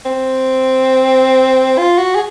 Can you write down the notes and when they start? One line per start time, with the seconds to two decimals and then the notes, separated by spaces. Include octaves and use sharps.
0.05 C4
1.78 F4
1.98 F#4
2.15 G#4